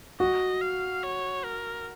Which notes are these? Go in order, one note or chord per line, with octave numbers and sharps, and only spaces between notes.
F#4 D#5
F5
C#5
A#4